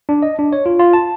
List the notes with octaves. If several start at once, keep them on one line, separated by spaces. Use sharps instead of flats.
D4
D#5
D4
C#5
F4
F4
A5